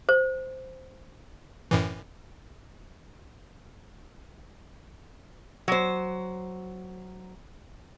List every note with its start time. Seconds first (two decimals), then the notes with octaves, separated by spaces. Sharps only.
0.09 C5
1.71 F#2 A2 E3
5.68 F#3 C5